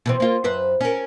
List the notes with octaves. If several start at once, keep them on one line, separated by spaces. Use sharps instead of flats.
B2 E3 C4
A#3 F4
F#2 B4 C5
C#4 A#4